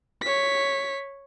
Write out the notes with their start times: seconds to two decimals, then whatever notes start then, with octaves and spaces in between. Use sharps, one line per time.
0.21 C#5 B6